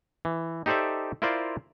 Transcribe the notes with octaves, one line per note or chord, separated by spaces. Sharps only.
E3
D#4 G4 A4 C5 D5 E5
E4 F4 A#4 C5 D5